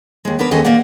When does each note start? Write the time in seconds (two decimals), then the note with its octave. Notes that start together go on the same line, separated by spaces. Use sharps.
0.25 D#2 G#3
0.39 B3 D4 A#4 B4
0.51 D#2 G#3 C#4 A4 D#5 G#5
0.65 A#2 A#3 B4 D5 F#5